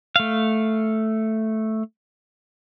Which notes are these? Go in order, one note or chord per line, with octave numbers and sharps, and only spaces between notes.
A3 F5